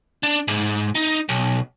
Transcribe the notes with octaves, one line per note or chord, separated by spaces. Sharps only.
D4
G#2
D#4
B1